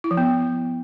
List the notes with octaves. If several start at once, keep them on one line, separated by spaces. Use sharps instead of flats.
E4
F3
B3